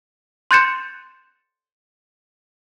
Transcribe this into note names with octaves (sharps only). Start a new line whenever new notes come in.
C6 F#6 G6 A6 C#7 E7